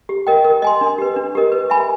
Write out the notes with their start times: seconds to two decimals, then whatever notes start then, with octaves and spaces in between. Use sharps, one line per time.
0.09 G4
0.27 A#4 D#5 G5
0.44 A#4
0.62 D#5 G#5 C6
0.81 D4
0.98 G4 B4
1.16 D4
1.35 G4 A#4 D#5
1.52 B4
1.70 E5 G#5 B5